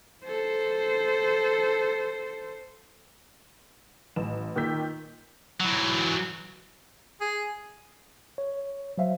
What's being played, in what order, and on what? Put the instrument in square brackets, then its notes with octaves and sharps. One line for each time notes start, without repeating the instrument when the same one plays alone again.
[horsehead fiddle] A4 C5
[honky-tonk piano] A1 E7
A#2 D#3 G5 E6 G6 B6
[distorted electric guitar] E3 F#3
[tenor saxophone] G#4
[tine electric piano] C#5
F#3 C5 E5 F5